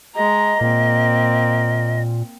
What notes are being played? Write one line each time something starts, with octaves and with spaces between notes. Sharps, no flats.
G#3 D#5 A#5
A#2 A#3 C4